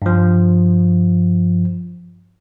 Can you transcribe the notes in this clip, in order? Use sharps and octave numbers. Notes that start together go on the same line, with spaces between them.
G2 F3